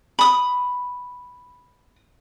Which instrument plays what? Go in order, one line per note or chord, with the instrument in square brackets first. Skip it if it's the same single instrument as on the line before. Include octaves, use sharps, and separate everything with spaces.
[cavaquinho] B5 D#6